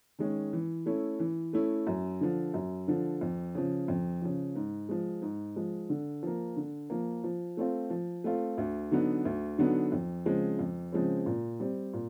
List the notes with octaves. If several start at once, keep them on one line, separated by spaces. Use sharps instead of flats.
D#3 G#3 C#4
E3
A3 C#4 E4
E3
A3 C#4 E4
F#2
D3 F3
F#2
D3 F3
F2
C#3 F3
F2
C#3 F3
G#2
F3 G#3
G#2
F3 G#3
D3
F3 A#3
D3
F3 A#3
F3
A3 C4 F4
F3
A3 C4 F4
D2
D3 F#3 B3 D#4
D2
D3 F#3 B3 D#4
F2
C#3 F3 G#3 C4
F2
C#3 F3 G#3 C4
A#2
G3 C4
A#2